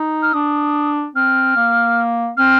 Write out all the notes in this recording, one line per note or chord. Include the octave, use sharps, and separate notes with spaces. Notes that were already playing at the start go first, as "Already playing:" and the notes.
Already playing: D#4
F6
D4 D#6
C4 F6
A#3
C4 F6